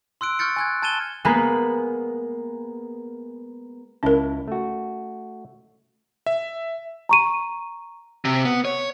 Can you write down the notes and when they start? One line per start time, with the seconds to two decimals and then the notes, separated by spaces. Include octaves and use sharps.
0.21 C6 E6 F#6 D7
0.39 C#6 F6 G6 A6 C#7
0.56 G#5 F#6 G#6
0.82 A5 G#6 A6 D#7 E7 G7
1.25 G#3 A#3 B3 B4
4.03 C#2 C#4 E4 A#4 A5
4.48 A3 F#4
6.26 E5
7.09 A#5 C#6 D#7
8.25 C3
8.45 B3
8.65 C#5